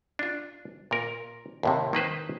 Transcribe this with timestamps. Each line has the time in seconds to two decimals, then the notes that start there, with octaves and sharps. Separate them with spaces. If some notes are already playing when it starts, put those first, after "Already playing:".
0.19 D4 F4
0.91 A#2 A#4
1.63 D#2 A2 C3
1.93 D#3 A#3 B4 C5